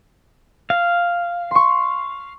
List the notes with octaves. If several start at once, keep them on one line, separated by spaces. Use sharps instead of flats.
F5
C6 C#6